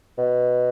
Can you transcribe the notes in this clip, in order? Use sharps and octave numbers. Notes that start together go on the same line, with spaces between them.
B2